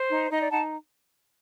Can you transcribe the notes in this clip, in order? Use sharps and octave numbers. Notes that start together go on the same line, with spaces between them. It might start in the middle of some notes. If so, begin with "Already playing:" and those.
Already playing: C5
D#4
D#4 D#5
D5
D#4 F#5 A5